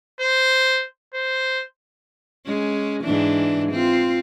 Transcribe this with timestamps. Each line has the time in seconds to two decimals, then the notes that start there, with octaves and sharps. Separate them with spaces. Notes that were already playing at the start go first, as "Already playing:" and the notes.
0.21 C5
1.14 C5
2.45 G#3 C#4
3.02 G#2 E3 D4
3.72 C4 F4